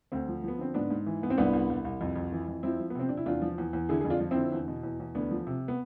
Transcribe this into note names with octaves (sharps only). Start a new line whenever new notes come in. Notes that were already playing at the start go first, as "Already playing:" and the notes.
D2 C4
F3
F3 B3
D3 C4
G#2 B3 D4
G#2
E3
G#2 B3
C4
C2 B3 D4
C2
C2
C2
F2
F2
E3
F2
F3 C4 E4
F3
B3
C3 C4
C3 D4
E4
E2 D4 F4
F3
E2
E2
D3 E4 G#4
F2 G#4
D4 F4
F3
C4 E4
D3
E2
B2
E2
E2
D2 B3 D4
F3
C3
B3